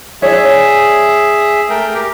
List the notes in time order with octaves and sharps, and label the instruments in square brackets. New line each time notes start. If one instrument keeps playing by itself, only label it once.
[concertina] G#4 E5 [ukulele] C#5 D5
[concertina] A3 A#4 G5
G4